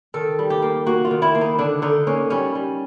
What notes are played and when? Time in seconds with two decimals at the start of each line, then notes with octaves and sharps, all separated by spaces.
0.14 D#3 A4
0.39 G3
0.50 G4
0.62 A#3
0.86 A#3 F#4
1.05 F4
1.11 D#3
1.22 E4
1.35 A#3
1.41 D#4
1.59 D3 D4
1.82 D3 D#4
2.07 A#3 C#4
2.30 G3 C#4
2.55 G3